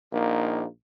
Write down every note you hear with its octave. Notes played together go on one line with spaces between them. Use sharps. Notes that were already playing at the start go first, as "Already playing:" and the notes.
A#1 A#3 D#4